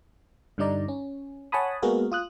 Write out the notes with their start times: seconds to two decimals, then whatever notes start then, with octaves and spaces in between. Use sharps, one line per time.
0.58 G2 D3 G3 D#4 D5 A#5
0.88 C#4
1.52 C#5 F#5 G#5 A5 B5 D#6
1.82 G#3 A#3 B3 F#4 G#4 A#4
2.12 F4 D#6 F#6